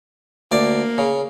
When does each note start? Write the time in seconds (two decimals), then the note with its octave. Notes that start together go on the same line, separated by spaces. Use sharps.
0.52 D2 A#3 D5
0.98 C#3